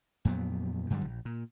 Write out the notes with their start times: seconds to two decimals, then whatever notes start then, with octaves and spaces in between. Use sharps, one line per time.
0.25 F2 A#2 F#3 B3
0.90 G2 D3 F#3 G3
1.05 A#1
1.25 A#2